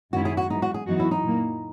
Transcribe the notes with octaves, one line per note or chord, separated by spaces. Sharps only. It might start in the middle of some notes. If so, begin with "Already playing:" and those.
F#2 D#3 G#3 C#4 E4 F#4
G#4
F#4
F#2 E3 G#3 D#4
F#4
G#4
F#2 E3 B3 D#4 F#4
E4
D#4
A#2 F#3 A#3